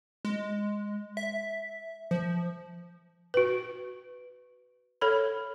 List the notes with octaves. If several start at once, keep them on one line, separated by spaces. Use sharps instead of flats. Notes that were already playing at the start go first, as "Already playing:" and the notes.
G#3
E5
F3
F#4 B4
A4 C#5 B5